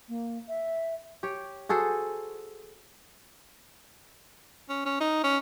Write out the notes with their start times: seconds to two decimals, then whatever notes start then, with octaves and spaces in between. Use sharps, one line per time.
0.09 A#3
0.49 E5
1.23 G4 C#5
1.69 F#4 G#4 A4 C5
4.69 C#4
4.86 C#4
5.01 D#4
5.24 C#4